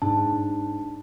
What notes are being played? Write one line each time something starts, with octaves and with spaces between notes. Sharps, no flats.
G#2 D4 A5